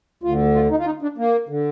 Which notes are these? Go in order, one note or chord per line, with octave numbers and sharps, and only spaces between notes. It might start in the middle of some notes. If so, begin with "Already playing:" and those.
D2 F4
D3
F4
D#4
F4
D#4
D4
A#3
D3